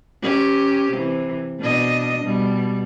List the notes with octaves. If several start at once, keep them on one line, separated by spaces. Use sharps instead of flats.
C#4 G4
C3 E3
B2 D4 D#5
B2 G3